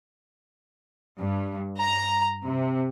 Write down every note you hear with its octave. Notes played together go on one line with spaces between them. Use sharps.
G2
A#5
C3